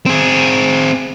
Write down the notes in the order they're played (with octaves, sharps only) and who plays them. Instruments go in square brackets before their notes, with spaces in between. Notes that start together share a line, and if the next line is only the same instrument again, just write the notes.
[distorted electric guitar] C4 G#4